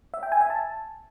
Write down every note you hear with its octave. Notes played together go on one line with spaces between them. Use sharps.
E5
G5
G#5
E5
A5